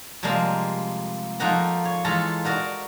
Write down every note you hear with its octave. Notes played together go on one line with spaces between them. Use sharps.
C3 F3 G3 G#3 A#3
F3 A3 A#3 D#4 F#5 A#5
C#5
E3 G#3 F4 A4 A#5
D#4 F#4 A#4 D5